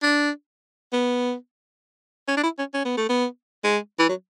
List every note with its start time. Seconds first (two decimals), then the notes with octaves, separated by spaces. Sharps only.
0.03 D4
0.93 B3
2.28 C#4
2.37 D4
2.43 E4
2.59 C#4
2.74 C#4
2.85 B3
2.97 A3
3.09 B3
3.64 G#3
3.99 E3
4.09 F#3